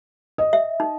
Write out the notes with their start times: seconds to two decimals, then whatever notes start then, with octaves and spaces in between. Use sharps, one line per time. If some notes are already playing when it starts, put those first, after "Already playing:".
0.38 D#5
0.53 E5
0.80 D#4